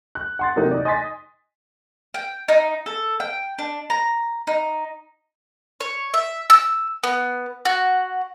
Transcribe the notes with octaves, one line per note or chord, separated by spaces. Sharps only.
F#6
F#5 C6 A6
C3 E3 F#3 A#3 D#4
D#4 D5
D#5 G#5 C6 A6 B6
G5
D#4
A4
G5
D4
A#5
D#4
C#5
E5
E6
B3
F#4